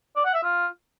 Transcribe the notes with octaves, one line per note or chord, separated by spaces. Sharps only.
D5
F#5
E5
F4